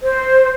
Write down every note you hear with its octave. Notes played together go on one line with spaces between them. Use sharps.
C5